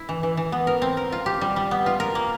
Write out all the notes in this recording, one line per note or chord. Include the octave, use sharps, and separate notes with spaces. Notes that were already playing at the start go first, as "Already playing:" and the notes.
Already playing: E4
E3
E3
E3
B3
A#4
C4
A#4
F4
G4
G3
G3
B3
F4
A#4
A#3